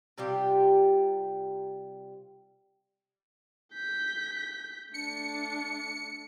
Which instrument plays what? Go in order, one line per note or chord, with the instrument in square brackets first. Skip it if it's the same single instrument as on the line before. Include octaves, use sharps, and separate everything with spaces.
[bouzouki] C3 G3 F4 G4
[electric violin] G6 B6
[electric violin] A3 D4 [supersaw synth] C#7